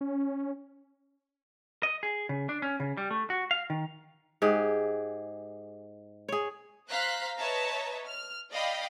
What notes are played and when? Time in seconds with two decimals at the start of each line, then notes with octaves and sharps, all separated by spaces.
0.01 C#4
1.83 D#5
2.03 G#4
2.29 C#3
2.49 D4
2.62 C#4
2.80 C#3
2.97 G3
3.11 A3
3.30 F#4
3.51 F5
3.70 D#3
4.42 G#2 G4 G#4
6.29 G#4 C#5
6.89 C5 F5 A#5 F#6 B6
7.37 B4 C#5 D#5 E5 A5 A#5
8.06 F6
8.51 D5 D#5 F5 G5 B5